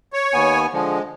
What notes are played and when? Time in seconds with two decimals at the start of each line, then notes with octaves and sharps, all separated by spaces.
0.13 C#5
0.33 D#2 B3 G#5
0.73 D3 F3 G#3